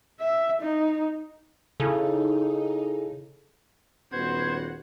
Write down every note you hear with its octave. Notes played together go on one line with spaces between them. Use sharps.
E5
D#4
C#3 D#4 E4 G#4 A4
D#1 B3 F#4 C5 F#5 G#6